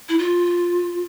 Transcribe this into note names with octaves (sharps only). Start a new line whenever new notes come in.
E4
F4